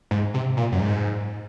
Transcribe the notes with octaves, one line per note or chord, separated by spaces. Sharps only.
G#2
C3
A#2
F#2
G#2